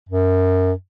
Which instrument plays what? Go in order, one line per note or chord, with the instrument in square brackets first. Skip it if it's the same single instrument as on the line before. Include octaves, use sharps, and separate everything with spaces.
[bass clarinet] F#2